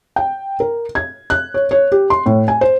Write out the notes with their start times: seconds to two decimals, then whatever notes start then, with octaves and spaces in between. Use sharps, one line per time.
0.16 G5
0.60 A#4
0.95 G#6
1.30 F#6
1.54 C#5
1.71 C#5
1.92 G4
2.10 C6
2.26 A2
2.48 G#5
2.61 C5